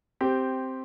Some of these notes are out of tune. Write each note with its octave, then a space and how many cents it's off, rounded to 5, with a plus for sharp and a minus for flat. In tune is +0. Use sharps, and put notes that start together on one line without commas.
C4 +0 G4 -5